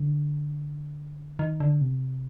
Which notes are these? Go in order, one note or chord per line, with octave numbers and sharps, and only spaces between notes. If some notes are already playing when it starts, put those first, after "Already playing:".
Already playing: D3
D#3
D3
C3